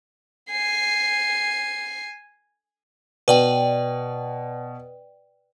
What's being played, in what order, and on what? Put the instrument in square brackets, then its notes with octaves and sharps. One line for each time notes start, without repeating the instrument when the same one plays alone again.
[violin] G#5 C7
[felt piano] B2 [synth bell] B4 D5 G5